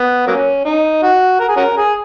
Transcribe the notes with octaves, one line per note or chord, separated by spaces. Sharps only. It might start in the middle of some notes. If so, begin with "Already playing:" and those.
Already playing: B3
F#3 A#3 C#4
D#4
F#4
A#4
G#4
C#4 F#4 A#4
G#4